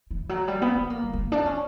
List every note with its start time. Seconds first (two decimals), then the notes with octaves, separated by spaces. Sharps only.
0.11 E3
0.29 F#3
0.48 G3
0.62 B3
0.76 B3
0.90 A#3
1.04 G3
1.13 B3
1.18 A#3
1.32 D4
1.46 C#4